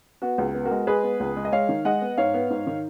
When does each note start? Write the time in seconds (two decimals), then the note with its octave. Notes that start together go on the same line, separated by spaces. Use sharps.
0.22 B3 F#4
0.38 C#2
0.55 B3
0.65 F#4 A#4
0.71 G#3
0.87 G#3 G#4 B4
1.03 B3
1.20 C#2
1.36 G#3
1.45 D#5
1.52 G#3 C#5 F5
1.69 D#3
1.85 G#3 D#5 F#5
2.01 B3
2.18 G#2 C#5 F5
2.34 B3
2.50 G#2
2.67 D#3